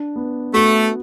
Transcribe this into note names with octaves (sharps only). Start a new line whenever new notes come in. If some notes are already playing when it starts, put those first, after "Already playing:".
Already playing: D4
B3
A3 F#4